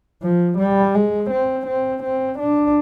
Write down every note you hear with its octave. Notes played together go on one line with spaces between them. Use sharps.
F3
G3
G#3
C4
C4
C4
D4